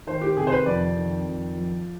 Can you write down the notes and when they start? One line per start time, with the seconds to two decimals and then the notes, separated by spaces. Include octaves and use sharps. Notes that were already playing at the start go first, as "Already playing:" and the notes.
0.07 D#3 C5
0.22 G4
0.37 C3 G#4
0.47 C5
0.52 B4
0.66 F2 D5
0.96 D#3
1.25 F2
1.55 F3